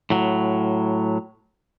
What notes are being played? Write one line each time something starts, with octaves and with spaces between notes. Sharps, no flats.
A2 F#3